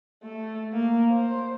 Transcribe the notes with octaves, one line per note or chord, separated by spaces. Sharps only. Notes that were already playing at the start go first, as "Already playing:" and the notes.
A3
A#3
C5